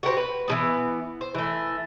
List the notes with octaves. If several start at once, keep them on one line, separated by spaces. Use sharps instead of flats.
F#4 G4 A#4 C5
B4
E3 F3 B3
C5
E3 A3